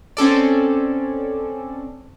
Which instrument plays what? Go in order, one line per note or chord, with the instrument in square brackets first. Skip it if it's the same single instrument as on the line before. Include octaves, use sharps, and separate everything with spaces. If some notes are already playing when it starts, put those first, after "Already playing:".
[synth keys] C4 C#4 A4 D5